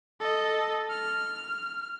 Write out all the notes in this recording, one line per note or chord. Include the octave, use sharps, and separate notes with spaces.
A4 D#5
F6